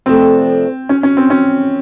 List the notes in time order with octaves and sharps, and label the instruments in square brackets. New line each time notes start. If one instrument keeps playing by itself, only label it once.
[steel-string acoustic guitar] F2 C3 F3 A3 D4 [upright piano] C4
[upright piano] C#4
C#4
C4
C#4